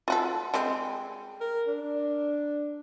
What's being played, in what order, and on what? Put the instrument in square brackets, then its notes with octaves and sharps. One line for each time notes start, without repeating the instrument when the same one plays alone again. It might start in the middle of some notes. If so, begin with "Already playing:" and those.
[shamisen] F4 F#4 A4
G3 G#3 C4
[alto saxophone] A#4
D4